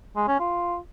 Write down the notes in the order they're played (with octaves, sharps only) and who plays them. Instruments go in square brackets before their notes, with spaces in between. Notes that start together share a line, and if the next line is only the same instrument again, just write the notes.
[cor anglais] G#3
C#4
F4